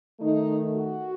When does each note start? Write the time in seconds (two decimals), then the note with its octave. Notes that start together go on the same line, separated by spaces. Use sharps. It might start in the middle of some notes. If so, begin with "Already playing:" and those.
0.20 D#3 A3 D#4
0.76 F#4